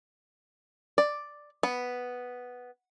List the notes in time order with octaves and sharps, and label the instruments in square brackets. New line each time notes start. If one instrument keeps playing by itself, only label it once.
[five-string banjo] D5
B3